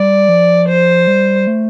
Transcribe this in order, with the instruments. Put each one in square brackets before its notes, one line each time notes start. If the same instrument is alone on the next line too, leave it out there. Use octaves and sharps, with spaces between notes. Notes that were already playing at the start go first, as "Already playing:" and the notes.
Already playing: [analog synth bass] G3 [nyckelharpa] D5
[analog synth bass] F3
[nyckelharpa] C5
[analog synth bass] G3
A3